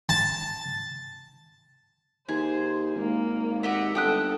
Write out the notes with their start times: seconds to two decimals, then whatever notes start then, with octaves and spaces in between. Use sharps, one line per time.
0.09 A5
2.29 D#2 G#4 C5
2.96 G#1 A#3
3.63 G4 D#5 E5 F#5
3.95 G1 A4 G5 D#6 F#6